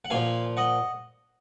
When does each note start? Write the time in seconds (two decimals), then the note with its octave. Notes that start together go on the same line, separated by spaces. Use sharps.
0.05 F#5
0.10 A#2 F3 F5 G#5
0.57 D#5 F#5